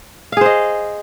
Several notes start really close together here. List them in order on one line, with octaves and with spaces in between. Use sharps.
F5 G#4 C5 D#5